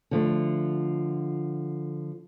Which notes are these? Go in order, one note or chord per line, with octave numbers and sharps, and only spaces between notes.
D3 F3 A3